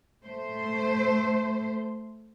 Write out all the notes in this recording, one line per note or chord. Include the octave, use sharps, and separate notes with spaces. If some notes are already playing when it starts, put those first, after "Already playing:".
A3 C5